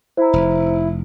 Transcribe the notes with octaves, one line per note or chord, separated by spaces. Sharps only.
E4 C5 A#5
F1